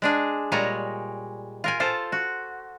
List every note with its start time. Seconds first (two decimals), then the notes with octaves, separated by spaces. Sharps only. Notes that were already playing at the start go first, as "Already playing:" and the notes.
0.02 G#3 D4 G#4
0.52 A#2 G3 G#3 C#5 G#5 A#5
1.64 F4 A#4 G#5
1.80 F4 A4 C5
2.12 F#4